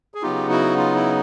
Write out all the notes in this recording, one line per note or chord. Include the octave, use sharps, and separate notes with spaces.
G#4
C#3 F#3 B3 D#4 F4 G4
E4 F#4
F4
E4